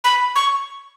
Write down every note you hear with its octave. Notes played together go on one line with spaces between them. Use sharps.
B5
C#6